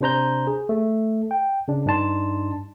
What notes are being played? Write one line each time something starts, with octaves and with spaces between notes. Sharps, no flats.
C3 D4 C5 A#5 G6
G#4
A3
G5
C#3 D4
G2 D4 D#4 A5 C6